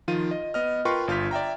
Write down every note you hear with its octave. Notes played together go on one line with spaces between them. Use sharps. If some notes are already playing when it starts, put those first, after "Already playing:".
D#3 F3 F4 D#7
D#5
B3 D#5 F6
F4 A#4 B4 G5 C6 C#6
G1 F4 F6 G6 B6
D5 E5 G5 A#5